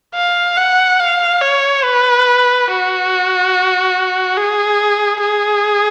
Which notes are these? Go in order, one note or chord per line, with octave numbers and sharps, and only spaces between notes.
F5
F#5
F5
C#5
B4
F#4
G#4
G#4